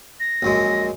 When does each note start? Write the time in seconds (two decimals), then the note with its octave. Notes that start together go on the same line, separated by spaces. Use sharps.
0.20 A#6
0.42 A#1 F#2 G#3